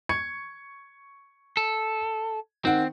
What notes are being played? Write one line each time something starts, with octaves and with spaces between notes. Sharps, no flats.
C#6 G#6 C#7
A4
D#3 C4 F#5